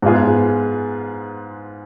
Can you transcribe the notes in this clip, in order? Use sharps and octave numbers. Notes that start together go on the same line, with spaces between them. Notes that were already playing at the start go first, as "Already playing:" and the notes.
G#2 G#3 B3 F4 G#4